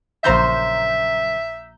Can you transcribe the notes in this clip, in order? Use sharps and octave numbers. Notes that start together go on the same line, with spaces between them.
A#1 F#2 C#3 C5 E5 A#5 G6